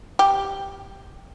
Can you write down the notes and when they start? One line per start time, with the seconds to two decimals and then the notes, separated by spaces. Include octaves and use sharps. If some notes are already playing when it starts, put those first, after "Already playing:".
0.19 G4